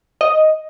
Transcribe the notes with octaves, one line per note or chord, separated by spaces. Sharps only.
D#5